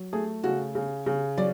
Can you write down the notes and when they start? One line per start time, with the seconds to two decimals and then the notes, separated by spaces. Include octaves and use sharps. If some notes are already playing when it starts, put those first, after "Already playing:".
Already playing: F#3
0.13 A3 G#4
0.44 C#3 F#4
0.75 C#3
1.06 C#3
1.38 F#3 D5